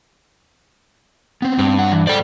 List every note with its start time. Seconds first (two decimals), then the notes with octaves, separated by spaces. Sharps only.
1.42 B3 C4
1.59 G2
1.79 F#3 F#5
1.92 E3
2.07 G#2 A4 C5 D5 G5